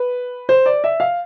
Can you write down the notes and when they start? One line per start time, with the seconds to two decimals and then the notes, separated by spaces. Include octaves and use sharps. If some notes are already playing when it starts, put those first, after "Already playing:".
Already playing: B4
0.49 C5
0.66 D5
0.84 E5
1.00 F5